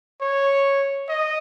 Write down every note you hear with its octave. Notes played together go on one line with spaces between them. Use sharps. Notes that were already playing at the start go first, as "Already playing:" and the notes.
C#5
D#5